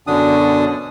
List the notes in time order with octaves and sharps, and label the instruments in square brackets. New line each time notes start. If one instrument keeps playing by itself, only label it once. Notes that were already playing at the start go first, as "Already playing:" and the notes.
[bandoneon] F#2 B2 D3 D4 D#6